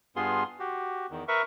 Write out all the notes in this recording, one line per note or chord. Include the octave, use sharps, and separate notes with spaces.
G2 B3 F4 G#4 C6
F#4 G4
E2 D#3
A#4 B4 E5 C#6